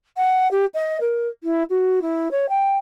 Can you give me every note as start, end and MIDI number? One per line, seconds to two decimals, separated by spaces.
0.17 0.48 78
0.51 0.65 67
0.74 0.97 75
1.01 1.28 70
1.43 1.63 64
1.70 2.00 66
2.02 2.28 64
2.31 2.46 73
2.49 2.77 79